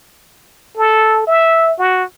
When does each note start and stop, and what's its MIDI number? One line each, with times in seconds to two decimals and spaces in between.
0.77 1.24 69
1.27 1.73 76
1.79 2.04 66